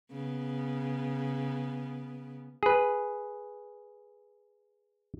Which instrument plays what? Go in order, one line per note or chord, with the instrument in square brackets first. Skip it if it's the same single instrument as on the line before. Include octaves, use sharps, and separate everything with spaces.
[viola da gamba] C#3 B3
[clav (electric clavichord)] G#4 B4